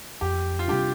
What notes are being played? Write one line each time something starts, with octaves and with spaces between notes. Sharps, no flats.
F2 G4
F4
C3 G3 D4 G4